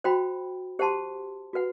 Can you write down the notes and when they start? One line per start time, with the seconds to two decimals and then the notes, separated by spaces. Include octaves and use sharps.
0.04 F#4 C5 G5 B5
0.79 G4 C5 F#5 A5 C6
1.53 F#4 B4 F#5